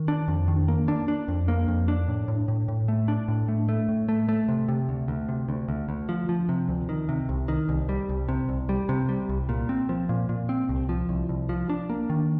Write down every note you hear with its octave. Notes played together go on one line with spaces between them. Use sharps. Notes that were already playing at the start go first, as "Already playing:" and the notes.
Already playing: D#3
D4
F2
D#3
A#3
D4
D4
F2
A#3
F2
D4
A2
A2
A2
A2
A3
D4
A2
A3
A3
A2
A3
A3
C3
C3
D2
D2
C3
D2
D2
D2
F3
F3
C3
D2
D#3
C3
C2
D#3
C2
G3
C2
C3
C2
G3
C3
G3
C2
A#2
C4
F3
A#2
A#2
C4
C2
F3
C2
C2
F3
D4
A#3
D#3